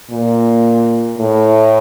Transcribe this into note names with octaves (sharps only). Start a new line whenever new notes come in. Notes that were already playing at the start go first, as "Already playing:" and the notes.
A#2
A2